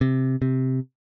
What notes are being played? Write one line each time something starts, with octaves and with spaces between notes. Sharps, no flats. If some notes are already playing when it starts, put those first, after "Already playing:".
C3
C3